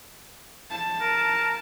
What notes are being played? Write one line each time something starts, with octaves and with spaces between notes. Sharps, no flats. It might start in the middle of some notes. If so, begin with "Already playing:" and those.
A5
A#4